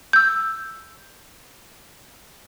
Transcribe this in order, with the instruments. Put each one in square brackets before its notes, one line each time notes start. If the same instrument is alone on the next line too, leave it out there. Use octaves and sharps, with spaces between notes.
[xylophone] E6 G6